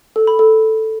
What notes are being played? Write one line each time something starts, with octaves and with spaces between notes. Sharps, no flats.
A4
B5
A4